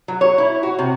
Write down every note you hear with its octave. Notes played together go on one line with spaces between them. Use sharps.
F#3
C#5
E4
F#4
C3